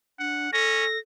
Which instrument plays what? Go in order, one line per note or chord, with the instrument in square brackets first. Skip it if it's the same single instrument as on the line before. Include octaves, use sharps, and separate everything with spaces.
[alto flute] D4 [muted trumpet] F#5
[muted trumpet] C#4 [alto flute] A4 [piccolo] A#6